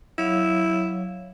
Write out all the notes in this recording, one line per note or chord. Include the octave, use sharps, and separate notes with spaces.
F#3 E4 C#5 F5